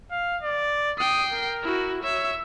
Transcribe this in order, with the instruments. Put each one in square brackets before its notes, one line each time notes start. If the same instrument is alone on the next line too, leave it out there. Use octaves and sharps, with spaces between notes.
[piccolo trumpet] F5
D5
[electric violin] G5 C7 [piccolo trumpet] D#6
[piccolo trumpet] A#4
[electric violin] E4 F#4
[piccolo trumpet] C#5 [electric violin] E5